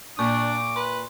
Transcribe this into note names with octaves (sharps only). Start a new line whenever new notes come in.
A#2 D4 C#6 D6
B4 C6